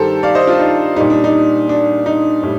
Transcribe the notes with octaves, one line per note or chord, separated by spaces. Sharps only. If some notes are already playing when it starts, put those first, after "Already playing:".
Already playing: G2 D#3 G3 G4 A4 A#4 C5
D5 F5
C5 D#5
D4 F4
D#4
A#2 G3 D#4
D4
D#4
D4
D#4
A2 G3